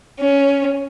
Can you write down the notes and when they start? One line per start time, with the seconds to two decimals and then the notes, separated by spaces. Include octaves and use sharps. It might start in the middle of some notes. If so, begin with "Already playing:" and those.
0.20 C#4